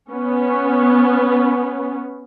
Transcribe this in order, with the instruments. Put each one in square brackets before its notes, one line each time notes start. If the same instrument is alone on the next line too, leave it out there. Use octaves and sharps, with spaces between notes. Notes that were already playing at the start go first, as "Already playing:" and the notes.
[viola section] B3 C#4